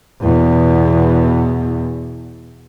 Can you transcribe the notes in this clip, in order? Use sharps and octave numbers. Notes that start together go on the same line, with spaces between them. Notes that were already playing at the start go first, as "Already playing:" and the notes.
E2 B2